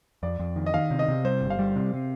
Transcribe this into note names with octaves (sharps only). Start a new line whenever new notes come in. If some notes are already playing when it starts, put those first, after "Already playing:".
F2 D5
F2
D#3
D#5
D#3 F5
C3
D#5
C3
G3 C5
G1
F5
G3
C3
C3